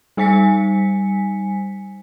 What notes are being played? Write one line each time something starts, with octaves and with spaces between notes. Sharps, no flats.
G3 D#4 C5 G#5 B6 C#7